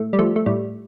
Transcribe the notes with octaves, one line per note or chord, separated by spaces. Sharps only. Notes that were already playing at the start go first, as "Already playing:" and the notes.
Already playing: A2 A3
G3
F3 A3
A3
A2 G3